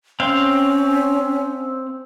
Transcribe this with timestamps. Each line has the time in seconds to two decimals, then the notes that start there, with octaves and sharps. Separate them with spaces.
0.20 C4 C#4 F5